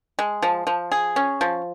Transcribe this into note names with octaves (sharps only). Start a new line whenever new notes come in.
G#3
F3
F3
G#4
C#4
F3